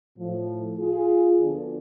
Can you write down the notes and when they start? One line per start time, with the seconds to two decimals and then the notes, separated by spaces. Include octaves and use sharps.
0.18 A2 F3
0.79 F4 G#4
1.40 D2 D3 F3 B3 D4